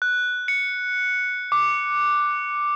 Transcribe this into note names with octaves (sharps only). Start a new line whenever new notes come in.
F#6
C#7
D6